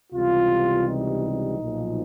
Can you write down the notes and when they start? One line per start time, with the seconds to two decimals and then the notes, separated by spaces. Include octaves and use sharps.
0.13 C#2 C3 E3 G3 F4
0.86 D#4
1.59 B1 A#2 F3